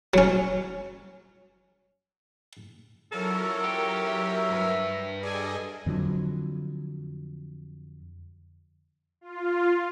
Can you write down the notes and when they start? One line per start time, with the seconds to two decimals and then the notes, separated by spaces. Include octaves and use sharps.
0.14 F#3 C#4
3.12 A#2 E3 F#3 C#4 A4 A#4
3.65 G4
4.07 E5
4.50 G2 B4
5.23 G3 G#4 A4 D5 D#5 G#5
5.86 F2 D3 F3 F#3
9.21 F4